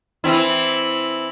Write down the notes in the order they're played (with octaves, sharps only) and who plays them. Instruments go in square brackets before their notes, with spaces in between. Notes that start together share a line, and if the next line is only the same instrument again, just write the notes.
[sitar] E3 C4 E4